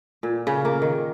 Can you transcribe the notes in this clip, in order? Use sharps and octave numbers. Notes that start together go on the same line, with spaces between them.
A#2
C#3
A#3
D#3